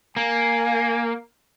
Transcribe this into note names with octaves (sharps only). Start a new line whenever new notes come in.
A#3 G#5